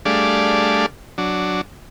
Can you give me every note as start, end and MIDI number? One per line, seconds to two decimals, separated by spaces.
0.05 0.86 55
0.05 0.86 57
0.05 0.86 62
0.05 0.86 68
0.05 0.86 74
0.05 0.86 77
1.18 1.61 54
1.18 1.61 62